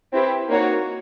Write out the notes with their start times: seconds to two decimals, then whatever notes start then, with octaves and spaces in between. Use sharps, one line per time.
0.13 C4 E4 G4 B4
0.50 A#3 D#4 F#4 A#4 C#5